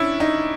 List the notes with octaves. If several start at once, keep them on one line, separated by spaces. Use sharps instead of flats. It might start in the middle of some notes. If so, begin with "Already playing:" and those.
Already playing: C#4 D4 E4
D#4